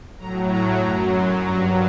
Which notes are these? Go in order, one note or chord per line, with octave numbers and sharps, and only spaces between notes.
A2 F#3 A#5
A#5
F#2 F#3 A#5
C6
G2 F#3 A#5